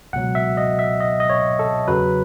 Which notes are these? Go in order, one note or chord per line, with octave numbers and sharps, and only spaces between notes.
C#2 B2 F#3 F#5
E5
D#5
E5
D#5
D#5
C#5
A4
E2 C#3 F#3 B4